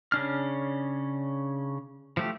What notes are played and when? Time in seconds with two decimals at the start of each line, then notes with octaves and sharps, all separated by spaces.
0.12 C#3 C#4 D4 F6
2.17 F3 A3 G4